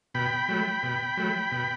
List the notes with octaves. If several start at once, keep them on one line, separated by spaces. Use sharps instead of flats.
B2 G5 B5
F#3 A3
B2
F#3 A3
B2